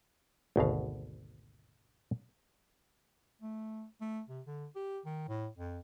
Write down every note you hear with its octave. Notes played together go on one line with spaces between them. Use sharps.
G#1 D2 B2 F5
A3
A3
C3
D3
G4
D#3
A2
F2